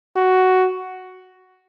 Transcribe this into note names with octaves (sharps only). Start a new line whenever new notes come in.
F#4